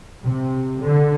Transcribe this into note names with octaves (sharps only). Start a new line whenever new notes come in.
C3
D3